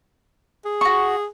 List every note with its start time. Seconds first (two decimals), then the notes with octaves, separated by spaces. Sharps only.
0.65 G#4
0.81 F#4 C#6